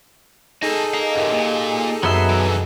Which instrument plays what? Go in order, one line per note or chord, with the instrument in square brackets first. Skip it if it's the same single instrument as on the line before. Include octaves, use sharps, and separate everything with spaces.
[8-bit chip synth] D#4 G#4 A4 [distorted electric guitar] D#5 A5
[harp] D#5 [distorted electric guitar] F5 A#5
[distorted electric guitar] F#2 C3 [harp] G4 A#4
[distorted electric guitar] A#2
[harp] F#2 [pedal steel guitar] F#3 B3 E5 [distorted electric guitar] C6
[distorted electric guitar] B2 E3